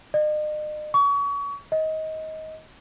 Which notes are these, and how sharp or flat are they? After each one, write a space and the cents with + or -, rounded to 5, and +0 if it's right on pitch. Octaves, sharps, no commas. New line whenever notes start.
D#5 -40
C#6 +30
D#5 +20